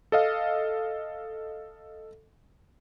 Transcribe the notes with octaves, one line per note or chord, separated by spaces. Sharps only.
A4 D#5 F5